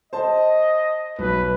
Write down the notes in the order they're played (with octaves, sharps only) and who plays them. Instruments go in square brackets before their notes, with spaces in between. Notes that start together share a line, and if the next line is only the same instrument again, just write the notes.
[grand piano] C5 A5 [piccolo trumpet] D#5
[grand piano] B1 [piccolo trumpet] B4